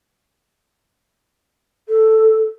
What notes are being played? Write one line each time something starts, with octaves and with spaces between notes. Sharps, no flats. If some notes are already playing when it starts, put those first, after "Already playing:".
A4